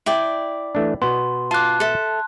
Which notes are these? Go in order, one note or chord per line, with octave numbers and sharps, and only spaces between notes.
E4 D5 G5
E3 A3 D4
B2 B3 C6
F4 A5 D6 F#6
A4 E5